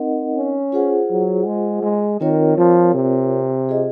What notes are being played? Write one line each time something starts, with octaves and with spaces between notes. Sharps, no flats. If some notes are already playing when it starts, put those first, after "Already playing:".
Already playing: C4 D#4 A#4 D#5 F#5
C#4
F4 G#4 C5 F#5
F#3
G#3
G#3
D#3 C4 F4 A#4 C#5
F3
C3
F4 G#4 D#5